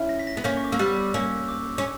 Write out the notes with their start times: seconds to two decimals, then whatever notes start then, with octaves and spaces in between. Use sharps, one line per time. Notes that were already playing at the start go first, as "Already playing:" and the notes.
Already playing: C#4 E4
0.09 A#6
0.19 B6
0.27 A#6
0.37 B3
0.44 A#3 C#4 G6
0.57 C#6
0.64 D6
0.72 A#3 E6
0.79 G3 B3 F#6
1.14 A#3 C#4 E6
1.48 D6
1.78 C#4